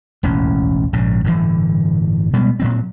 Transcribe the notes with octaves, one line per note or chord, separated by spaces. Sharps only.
E1 A1 D#2 C#4
A#1 G#2 C#3
G1 A2 D3 E3
B2 G3 G#3 B3
A#2 F#3 C4